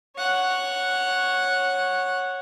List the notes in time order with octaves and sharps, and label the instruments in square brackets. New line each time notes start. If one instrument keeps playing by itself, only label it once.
[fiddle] C#5 F#5